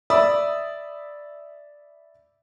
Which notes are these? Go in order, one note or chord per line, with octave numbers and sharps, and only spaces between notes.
D5 E5 B5 D#6 E6